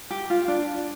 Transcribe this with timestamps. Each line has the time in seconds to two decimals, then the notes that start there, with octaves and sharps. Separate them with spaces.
0.11 G4
0.30 F4
0.48 D4